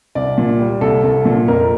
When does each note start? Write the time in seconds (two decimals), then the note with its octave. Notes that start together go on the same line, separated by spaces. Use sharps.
0.15 C2 D5
0.38 A#2
0.59 G3
0.81 C2 A4
1.04 C2
1.25 A#2
1.48 F2 A#4